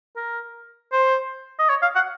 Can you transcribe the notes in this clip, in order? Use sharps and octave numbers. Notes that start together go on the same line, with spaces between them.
A#4
C5
D#5
C#5
F5
F#5